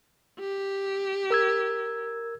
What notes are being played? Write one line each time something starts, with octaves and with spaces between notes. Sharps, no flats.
G4
A#4 E6 G#6